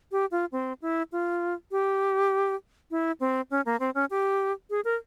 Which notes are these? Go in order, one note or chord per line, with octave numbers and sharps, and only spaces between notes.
G4
F4
C4
E4
F4
G4
E4
C4
C#4
A#3
C4
C#4
G4
G#4
A#4